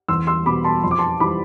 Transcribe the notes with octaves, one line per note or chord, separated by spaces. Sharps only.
E2 C6 E6
C6 E6
B2 G3 B5 D6
A5 C6
F2 C6
D6
A5 C6
E3 G3 B5 D6